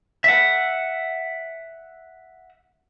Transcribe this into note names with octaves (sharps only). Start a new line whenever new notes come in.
E5 F#5